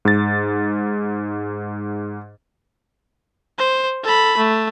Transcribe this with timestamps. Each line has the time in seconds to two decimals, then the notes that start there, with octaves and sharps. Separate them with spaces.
0.05 G#2 A6
3.58 C5
4.03 A4 B5
4.38 A3